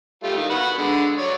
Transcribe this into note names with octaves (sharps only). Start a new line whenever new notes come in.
G3 A3 F4
D#3
F#4 B4 F#5
D3 G#3
F#3 C#5 D5